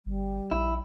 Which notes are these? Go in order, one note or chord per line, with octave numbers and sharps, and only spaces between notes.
G1 G3
A#1 E4